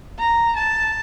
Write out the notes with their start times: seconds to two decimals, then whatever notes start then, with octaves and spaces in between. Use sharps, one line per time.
0.19 A#5
0.56 A5